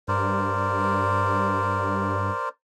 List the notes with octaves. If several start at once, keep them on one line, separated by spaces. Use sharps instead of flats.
G2 A#4 C5 D5